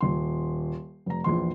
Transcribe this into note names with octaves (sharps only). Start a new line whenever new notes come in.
D#1 C6
F1 A#5
A#1 E2 C6